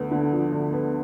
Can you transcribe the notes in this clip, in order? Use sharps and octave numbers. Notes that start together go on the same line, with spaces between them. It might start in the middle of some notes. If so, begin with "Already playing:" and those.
Already playing: D2 B3
D3
F3
D2
B3